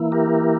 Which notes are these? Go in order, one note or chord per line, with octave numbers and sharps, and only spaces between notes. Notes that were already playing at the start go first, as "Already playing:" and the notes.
Already playing: E3 A#3 E4
G4 A#4